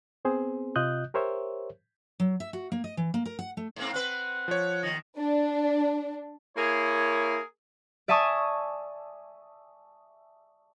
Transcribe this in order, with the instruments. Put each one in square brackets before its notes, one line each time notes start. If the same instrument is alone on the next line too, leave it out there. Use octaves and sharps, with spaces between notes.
[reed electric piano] B3 C4 G#4 C5
C3 F4 D#5 D#6 F#6 G6
G4 A#4 C5 C#5 E5
[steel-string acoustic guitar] F#3
E5
F#4
A#3
D#5
E3
A#3
A#4
F#5
A3
[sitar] G#2 A#3 C4
[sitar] C4 B4 [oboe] F#5
[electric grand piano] F3 C#5
[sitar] D#2 D#3 [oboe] D#5
[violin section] D4
[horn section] A#3 E4 G#4 A#4 C#5
[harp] D5 E5 G#5 A5 C#6 D#6